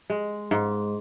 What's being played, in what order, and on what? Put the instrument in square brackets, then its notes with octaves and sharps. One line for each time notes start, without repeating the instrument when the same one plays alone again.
[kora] G#3
G#2